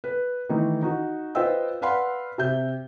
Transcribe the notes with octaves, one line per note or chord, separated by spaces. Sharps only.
B4
D#3 E3 A3 D#4
D#4 F#4
F4 B4 C5 D#5 G5 E6
B4 D5 F5 F#5 B5 C6
C3 E5 G6